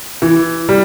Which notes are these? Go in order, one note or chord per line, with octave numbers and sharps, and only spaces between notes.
E3
G3